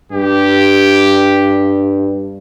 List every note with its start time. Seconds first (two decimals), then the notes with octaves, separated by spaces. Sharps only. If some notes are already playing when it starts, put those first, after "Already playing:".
0.12 G2 G4